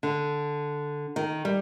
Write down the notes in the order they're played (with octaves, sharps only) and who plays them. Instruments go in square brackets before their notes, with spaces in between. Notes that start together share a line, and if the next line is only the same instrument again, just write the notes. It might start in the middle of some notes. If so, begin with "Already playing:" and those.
[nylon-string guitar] D3
D#3
G3